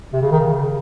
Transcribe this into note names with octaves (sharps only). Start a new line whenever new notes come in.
C3
C#3
D#3
C#3